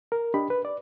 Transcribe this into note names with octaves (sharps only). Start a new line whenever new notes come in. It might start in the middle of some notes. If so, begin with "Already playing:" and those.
A#4
D4 G4 D#5 B5
B4
D5